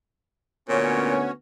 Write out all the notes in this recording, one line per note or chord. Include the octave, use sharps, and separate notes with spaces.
D2 A#2 B3 C#4 F#4 C#5